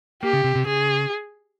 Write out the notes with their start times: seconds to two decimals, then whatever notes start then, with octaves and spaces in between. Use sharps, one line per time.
0.23 A#3 G4
0.33 C#3
0.44 C3
0.55 C3
0.66 C#3 G#4